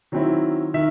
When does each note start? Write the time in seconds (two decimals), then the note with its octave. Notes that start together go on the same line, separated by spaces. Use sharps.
0.12 D#3 F#3 C4 E4
0.74 D#3 E5